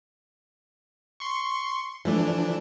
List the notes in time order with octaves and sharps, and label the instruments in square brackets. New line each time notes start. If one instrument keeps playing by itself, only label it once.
[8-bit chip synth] C6 C#6
[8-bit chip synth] E3 D4 [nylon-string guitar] F3 A3